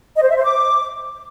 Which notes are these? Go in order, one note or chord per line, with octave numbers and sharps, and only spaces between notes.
D#5
C5
E5
C5
D6